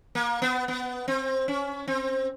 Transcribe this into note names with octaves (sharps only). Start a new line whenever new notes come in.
A#3
B3
B3
C4
C#4
C4